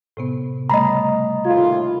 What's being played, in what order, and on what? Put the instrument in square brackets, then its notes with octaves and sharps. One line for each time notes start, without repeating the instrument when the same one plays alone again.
[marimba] A2 C3 B3
[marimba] C#3 G3 A3 [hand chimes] D#5 B5 [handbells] A#5
[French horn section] D#2 A2 F4 [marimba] G#6